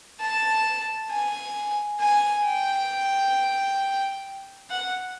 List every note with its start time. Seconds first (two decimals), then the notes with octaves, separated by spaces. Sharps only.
0.20 A5
1.10 G#5
2.01 G#5
2.45 G5
4.70 F#5